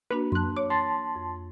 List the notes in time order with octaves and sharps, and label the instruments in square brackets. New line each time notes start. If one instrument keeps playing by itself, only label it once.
[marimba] A#3 D4 F#4 [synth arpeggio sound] B4 B5
[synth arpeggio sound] F#2 F#6 [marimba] A5 C6
[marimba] C#5 [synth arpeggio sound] D6
[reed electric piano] A5 C6 [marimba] A6
[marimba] F2